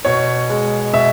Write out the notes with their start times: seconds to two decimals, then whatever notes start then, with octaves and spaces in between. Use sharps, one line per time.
0.05 B2 C#5
0.50 G#3
0.93 B2 E5